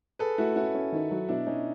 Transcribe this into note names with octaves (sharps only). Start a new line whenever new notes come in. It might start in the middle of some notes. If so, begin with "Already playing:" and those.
G#4 A4 B4
A3 E4 F#4
C#4 E4 F#4
C#4
D#3
F#3
B2 D4 E4
B2 C#4 D#4